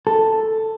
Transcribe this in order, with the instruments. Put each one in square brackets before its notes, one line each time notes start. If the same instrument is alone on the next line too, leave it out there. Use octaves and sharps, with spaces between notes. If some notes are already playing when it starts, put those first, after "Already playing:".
[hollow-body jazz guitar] A4